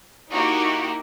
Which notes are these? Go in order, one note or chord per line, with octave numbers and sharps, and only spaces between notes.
A#3 D#4 E4 F#4 G4